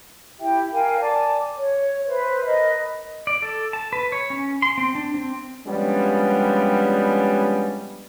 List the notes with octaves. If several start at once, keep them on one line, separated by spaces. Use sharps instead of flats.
E4 G4 E5 G5
A#4 F5 G5 G#5
D5 G#5 A5 D6
C#5
B4 C5 E5
A#4 B4 D#5
D5
A4
A5
B4
C#5
C#4
C6
C4
D4
C4
F3 G3 G#3 B3 C#4 D4